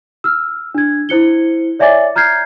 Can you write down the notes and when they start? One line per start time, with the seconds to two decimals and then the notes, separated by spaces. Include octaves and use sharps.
0.24 E6 F6
0.75 D4 G#6
1.09 E4 C5 C#7 G7
1.79 C#5 D5 E5 G#5 D6 A6
2.16 A#5 F6 G6 G#6 C7